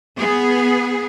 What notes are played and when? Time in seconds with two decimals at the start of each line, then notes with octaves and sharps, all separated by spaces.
0.18 B3 G#4